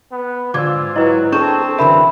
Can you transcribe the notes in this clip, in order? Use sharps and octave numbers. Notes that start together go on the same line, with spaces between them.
B3
G#2 D3 F4 D5 D6 E6 G#6
F#3 E4 B4 D#5
C4 D4 G#4 A4 C#6 G6 E7
F#2 D3 E3 A#4 E5 B5